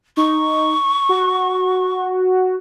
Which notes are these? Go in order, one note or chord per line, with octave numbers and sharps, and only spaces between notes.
D#4 C#6
F#4